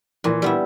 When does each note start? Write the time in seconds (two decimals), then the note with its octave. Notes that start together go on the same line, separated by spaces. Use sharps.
0.24 A#2 E3
0.42 G3 B3 E4